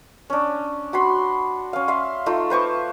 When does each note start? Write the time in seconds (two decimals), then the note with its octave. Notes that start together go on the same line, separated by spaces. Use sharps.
0.30 C#4 D4
0.93 F#4 B5 C6
1.73 C#4 F5
1.88 E5 F5 C6
2.26 A3 D#4 F4
2.50 B4 C5 C#6 D6